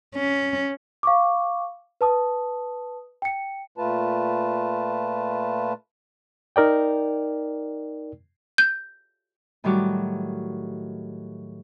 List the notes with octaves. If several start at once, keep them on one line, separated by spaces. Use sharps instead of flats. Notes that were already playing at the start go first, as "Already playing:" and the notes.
C#4
F5 C#6 D6
B4 A5 D#6
G5 C#7
A#2 A3 F4 B4 A5
D#4 A#4 D5 G5
G6
A2 D#3 F#3 G3 F#4 D6